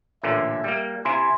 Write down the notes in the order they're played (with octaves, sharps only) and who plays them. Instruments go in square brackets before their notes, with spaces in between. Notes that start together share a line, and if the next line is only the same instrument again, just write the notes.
[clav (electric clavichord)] A1 A#2 D3 [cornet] E5
[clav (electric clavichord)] G3 A#3
[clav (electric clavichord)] C3 E4 [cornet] G#5 [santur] C6